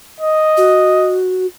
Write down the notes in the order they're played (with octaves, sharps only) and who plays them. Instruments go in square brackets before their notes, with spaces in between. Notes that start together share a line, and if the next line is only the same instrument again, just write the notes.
[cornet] D#5
[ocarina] F#4